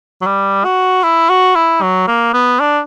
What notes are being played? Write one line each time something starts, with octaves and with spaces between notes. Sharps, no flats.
F#3
G3
F#4
E4
F#4
E4
F#3
A#3
B3
D4